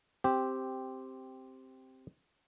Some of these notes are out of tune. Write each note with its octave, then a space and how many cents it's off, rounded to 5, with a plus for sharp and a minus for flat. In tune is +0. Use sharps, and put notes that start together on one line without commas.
C4 +0 G4 +0